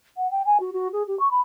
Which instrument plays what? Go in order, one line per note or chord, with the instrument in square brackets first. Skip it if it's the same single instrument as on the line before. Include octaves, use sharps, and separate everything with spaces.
[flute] F#5
G5
G#5
F#4
F#4
G#4
G4
C#6
B5